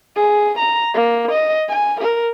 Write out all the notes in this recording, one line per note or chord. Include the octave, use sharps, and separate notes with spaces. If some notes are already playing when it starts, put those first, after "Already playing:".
G#4
A#5
A#3
D#5
G#5
A#4